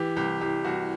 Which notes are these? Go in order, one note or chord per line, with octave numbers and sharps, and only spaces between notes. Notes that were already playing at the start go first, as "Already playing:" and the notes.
Already playing: E3 G4
C2 G4
C2 G4
C2 F#4